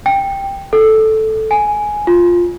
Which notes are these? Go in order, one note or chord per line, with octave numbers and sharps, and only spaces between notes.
G5
A4
G#5
F4